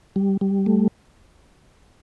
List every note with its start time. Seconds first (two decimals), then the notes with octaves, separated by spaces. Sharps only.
0.16 G3
0.41 G3
0.66 A3